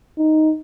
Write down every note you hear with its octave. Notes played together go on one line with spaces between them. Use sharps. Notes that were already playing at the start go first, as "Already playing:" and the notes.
D#4